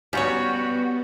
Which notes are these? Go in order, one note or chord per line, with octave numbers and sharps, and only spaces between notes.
G3 B3 C#4 D#4 F#4 C#5